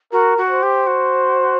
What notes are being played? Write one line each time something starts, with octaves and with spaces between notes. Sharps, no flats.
F#4 A#4
F#4
C5
G4
F#4